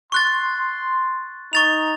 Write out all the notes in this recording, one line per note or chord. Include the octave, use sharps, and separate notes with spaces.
C6 C#6 F#6 A6
D#4 C#6 A6 F7